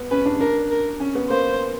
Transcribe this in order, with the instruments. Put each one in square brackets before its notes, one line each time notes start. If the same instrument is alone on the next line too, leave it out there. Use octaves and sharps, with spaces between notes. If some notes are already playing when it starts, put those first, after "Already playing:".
Already playing: [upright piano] B3
[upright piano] C#4 [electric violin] B4
[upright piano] D4
[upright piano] D4 [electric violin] A#4
[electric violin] A#4
[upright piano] C#4
B3
[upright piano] A#3 [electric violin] C5